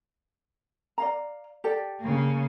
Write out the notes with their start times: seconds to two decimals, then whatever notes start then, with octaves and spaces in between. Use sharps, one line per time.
0.98 D5 F5 A#5
1.64 G4 A4 D5
2.01 C#3 A#3